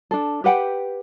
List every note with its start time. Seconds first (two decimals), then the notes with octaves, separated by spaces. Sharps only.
0.11 D4 A4
0.44 G4 B4 F#5 G5